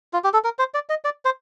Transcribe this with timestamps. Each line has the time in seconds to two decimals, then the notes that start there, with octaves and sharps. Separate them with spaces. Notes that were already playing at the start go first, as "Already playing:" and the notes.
0.13 F4
0.24 G4
0.33 A4
0.44 A#4
0.59 C5
0.74 D5
0.89 D#5
1.05 D5
1.25 C5